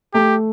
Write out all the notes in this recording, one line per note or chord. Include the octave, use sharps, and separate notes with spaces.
A3 G4